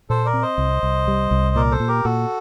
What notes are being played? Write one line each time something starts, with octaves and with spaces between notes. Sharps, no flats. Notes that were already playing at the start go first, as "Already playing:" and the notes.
A#2 A4 C5
A#4 D5
C4
C5 D#5
C2
C2
G3
C2
A#2 A#4 D5
A4 C5
A#2
G4 A#4
A#2 F#4 A4